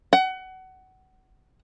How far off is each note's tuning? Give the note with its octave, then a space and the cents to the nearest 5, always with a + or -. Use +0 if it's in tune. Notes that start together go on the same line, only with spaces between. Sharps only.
F#5 +25